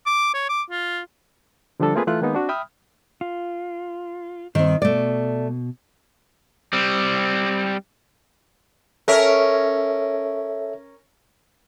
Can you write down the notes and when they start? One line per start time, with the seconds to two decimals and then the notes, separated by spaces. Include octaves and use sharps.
0.06 D6
0.34 C#5
0.49 D6
0.70 F4
1.80 D3 F3 G3 D4 A4
1.95 A3 A#3 C4 F4 G#4 B4
2.07 E3 A3 F4 F#6
2.21 D#3 G#3 A#3 B3 D#4
2.33 C4 D4 F#4
2.49 E5 G5 B5 D#6 F6
3.21 F4
4.55 G2 D#3 C4
4.82 B2 A3 D5
6.73 G3 C4
9.08 C#4 A4 A#4 C#5 E5